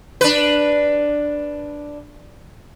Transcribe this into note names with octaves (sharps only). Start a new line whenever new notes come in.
D4 B4